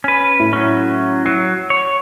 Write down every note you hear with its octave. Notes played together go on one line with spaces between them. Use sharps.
C#4 B4
A2
F#3 C#4
F#3 C7
C#5